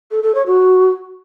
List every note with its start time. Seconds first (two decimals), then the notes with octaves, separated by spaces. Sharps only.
0.11 A4
0.23 A4
0.35 C#5
0.46 F#4